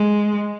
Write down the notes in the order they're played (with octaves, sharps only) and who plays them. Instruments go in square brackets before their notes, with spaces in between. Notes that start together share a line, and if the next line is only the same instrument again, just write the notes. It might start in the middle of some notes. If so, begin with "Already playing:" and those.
Already playing: [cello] G#3